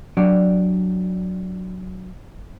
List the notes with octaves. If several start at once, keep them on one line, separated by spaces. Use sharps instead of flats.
F#3 D4 G4 D5